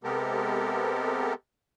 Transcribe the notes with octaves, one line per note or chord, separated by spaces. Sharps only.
C3 G#3 B3 G4 A4 A#4